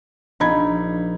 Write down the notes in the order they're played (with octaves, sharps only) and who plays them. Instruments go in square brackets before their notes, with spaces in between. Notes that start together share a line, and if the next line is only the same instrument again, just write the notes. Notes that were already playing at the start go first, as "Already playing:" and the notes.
[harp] A#1 [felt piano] D#4 B5 G#6